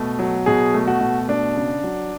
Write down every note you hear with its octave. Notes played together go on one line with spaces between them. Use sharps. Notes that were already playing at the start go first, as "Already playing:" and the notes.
Already playing: B2 A3
F#3
B2 G#4
A3
F#4
B2
A3 D4
C#3
F#3